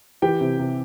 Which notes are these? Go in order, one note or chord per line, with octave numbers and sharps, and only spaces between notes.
E3 G4 G5
C3
C3